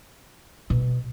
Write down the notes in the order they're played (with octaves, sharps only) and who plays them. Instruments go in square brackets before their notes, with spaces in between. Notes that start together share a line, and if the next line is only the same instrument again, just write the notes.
[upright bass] B2